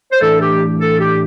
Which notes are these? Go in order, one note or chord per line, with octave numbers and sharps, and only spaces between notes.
C5
A2 E3 A3 D4 A4
G4
A4
G4